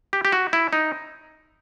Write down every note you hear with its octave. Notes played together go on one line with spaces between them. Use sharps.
G4
G4
F#4
E4
D#4